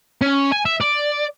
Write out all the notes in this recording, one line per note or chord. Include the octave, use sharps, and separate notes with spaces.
C#4
G#5
E5
D5